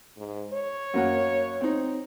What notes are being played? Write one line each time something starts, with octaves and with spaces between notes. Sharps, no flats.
G#2
C#5
F#2 A#3 F#5
C4 D#4